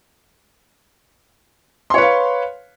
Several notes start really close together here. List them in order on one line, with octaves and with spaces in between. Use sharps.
C6 C#5 B4 F5